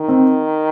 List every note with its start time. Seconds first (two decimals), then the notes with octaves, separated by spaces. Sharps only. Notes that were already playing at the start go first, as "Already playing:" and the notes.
Already playing: D#3
0.08 C4